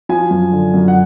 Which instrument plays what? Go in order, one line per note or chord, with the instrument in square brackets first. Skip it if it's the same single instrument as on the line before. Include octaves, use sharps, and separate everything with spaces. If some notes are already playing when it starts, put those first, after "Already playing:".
[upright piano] F3 G#5
F#2
D3
F#2
F#5